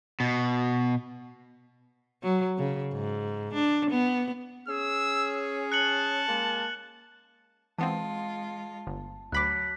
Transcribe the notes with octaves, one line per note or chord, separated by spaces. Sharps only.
B2
F#3
C#3
G#2
D4
B3
C#4 G#4 E6
A5 F#6 C#7 F#7
G#3 A#3
E3 G#3 B3 C4 F4 A5
G1
D2 F#3 B5 D6 F#6 B6